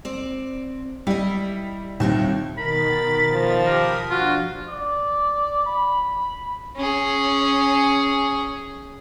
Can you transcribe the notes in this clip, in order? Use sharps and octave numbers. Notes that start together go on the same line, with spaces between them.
C4 D5
G3 E4 D#5
D#2 A#2 G3 C4 F4 F#4 E5
B2 D#3 A#4 B5 A6
F3
G4 A#4 B5 D#6
F3 D4 F4 F#4
D5
B5
C#4 G#4